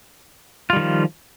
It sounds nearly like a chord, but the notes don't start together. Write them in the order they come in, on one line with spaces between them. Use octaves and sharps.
F4 G3 D#3 F3